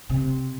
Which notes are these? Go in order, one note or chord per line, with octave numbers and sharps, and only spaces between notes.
C3